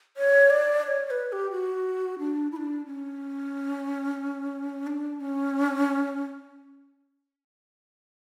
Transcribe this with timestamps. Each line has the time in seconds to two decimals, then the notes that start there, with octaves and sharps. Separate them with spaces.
0.17 C#5
0.50 D5
0.84 D5
0.88 C#5
1.06 C#5
1.10 B4
1.29 B4
1.32 G4
1.51 F#4
2.19 D4
2.52 E4
2.56 D4
2.86 C#4
4.87 D4
5.20 C#4